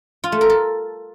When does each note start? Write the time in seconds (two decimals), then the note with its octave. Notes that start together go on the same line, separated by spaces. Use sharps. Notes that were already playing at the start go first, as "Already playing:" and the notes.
0.24 F4
0.32 A3
0.41 A#4
0.50 A4